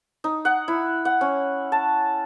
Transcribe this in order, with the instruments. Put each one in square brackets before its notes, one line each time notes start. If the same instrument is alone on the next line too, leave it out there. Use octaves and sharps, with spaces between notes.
[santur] D#4
F#5
E4
F#5
C#4
A5